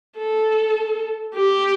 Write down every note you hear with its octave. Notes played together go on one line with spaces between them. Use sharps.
A4
G4